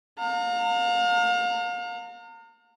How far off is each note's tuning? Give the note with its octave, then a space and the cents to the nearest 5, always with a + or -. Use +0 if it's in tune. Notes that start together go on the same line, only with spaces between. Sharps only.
F5 +35 A#5 -35